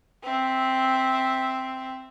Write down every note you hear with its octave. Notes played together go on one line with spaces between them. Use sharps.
C4 E5